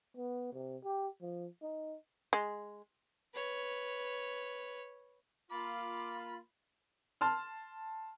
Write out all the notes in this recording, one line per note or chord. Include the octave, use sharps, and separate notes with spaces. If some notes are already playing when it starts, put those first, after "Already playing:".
B3
C3
G4
F3
D#4
G#3
B4 C#5
A#3 F4 B5 D6
A5 C6 F6